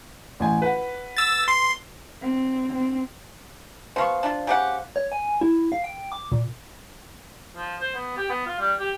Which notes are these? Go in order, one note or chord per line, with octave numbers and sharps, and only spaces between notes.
A1 G#5
B4 F#5
E6 A6
C6
C4
C4
B2 B3 C5 F5 C#6
D4 F4
C#3 G4 F#5
C#5
G#5
E4
F5
G5
D6
A#2
F3
C5
B3
G4
B3
F4
G3
G4